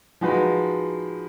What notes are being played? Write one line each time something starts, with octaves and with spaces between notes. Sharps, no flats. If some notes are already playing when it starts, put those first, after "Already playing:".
F3 G#3 D#4 F#4 B4